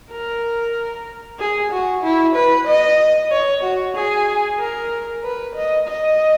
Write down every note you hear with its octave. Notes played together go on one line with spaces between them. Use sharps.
A#4
G#4
F#4
E4
B4
D#5
C#5
F#4
G#4
A#4
B4
D#5
D#5